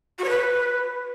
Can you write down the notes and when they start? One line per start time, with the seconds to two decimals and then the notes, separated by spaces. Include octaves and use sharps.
0.19 F#4
0.24 C#5
0.29 B4